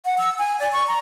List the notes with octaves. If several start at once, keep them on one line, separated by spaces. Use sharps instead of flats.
F#5
E6
G#5
D5
C#6
A#5